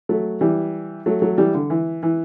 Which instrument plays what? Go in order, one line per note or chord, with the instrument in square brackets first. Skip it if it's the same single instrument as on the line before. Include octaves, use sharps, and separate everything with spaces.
[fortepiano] F#3 A3
E3 G3
F#3 A3
F#3 A3
E3 G3
D3
E3
E3